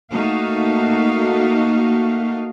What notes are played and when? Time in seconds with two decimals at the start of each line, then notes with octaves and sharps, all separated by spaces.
0.13 A3 A#3 D#4 F#4 F5